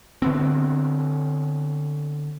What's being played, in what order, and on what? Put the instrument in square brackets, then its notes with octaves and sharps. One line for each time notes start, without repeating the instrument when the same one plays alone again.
[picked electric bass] D3 B3 C4